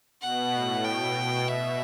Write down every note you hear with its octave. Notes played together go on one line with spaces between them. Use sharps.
B2 F#5
A2
B2 G5
B2
B2 E5